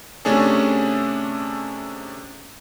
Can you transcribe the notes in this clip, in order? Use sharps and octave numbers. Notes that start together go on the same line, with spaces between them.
C3 A3 C#4 D4 G#4 A4